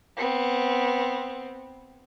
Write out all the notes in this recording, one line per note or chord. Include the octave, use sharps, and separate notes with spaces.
B3 C4